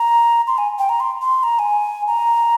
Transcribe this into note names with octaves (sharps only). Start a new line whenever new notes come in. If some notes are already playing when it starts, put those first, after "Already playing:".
Already playing: A#5
C6
G#5
G5
A#5
C6
C6
A#5
G#5
A#5